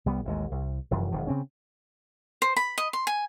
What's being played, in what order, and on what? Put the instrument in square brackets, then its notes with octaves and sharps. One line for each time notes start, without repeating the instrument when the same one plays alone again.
[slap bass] C2 G3 B3
A1 D#2 G#3
C2
F1 F#2 E3
E1 D#3 F3
C#3 C4 C#4
[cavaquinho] C5
B5
D#5
C6
G#5